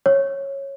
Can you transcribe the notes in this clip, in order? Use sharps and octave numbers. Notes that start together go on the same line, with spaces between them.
C#5